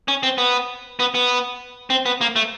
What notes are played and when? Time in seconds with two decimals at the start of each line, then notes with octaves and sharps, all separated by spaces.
0.08 C#4
0.23 C4
0.38 B3
1.00 B3
1.15 B3
1.90 C4
2.06 B3
2.21 A#3
2.36 A3